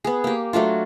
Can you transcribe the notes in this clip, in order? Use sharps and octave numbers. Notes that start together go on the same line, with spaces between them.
B3 G#4
A#3 G4
F#3 A3 D4 F4